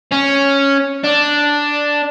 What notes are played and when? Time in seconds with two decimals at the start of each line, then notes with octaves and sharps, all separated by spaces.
0.11 C#4
1.04 D4